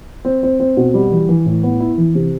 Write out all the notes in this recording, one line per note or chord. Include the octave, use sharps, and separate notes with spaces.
C4
C4
C4
B2
G3
E3
E3
A2
B3
E4
E3
C3